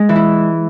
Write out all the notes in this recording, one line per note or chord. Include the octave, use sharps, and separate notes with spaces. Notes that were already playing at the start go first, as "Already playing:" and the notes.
Already playing: G#3
E3
E4